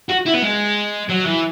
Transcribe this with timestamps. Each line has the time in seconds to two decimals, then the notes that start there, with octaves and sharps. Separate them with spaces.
0.09 F#4
0.26 E4
0.34 B3
0.42 G#3
1.10 F#3
1.26 E3